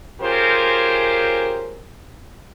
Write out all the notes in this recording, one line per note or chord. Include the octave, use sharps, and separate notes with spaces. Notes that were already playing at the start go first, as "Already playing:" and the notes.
C#4 F4 G4 G#4 A#4 C5